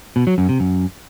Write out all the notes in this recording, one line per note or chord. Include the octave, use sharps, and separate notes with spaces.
B2
F#3
F#2
C3
F#2